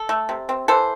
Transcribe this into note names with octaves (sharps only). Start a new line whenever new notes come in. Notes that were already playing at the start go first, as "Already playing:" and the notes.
Already playing: A4
A3
C3
C4
E3 A4 C5